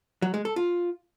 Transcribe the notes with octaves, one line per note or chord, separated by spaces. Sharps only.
F#3
G#3
A4
F4